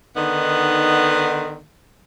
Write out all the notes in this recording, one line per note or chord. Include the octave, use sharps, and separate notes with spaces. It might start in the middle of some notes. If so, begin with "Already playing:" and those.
D3 D#3 B3 D#4